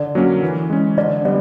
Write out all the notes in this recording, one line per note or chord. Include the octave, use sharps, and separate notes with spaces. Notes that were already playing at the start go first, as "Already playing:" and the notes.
Already playing: D3 D5
F#3 A#3 C#4
E3
G#3 C#4
D3 D5
G3 B3 D5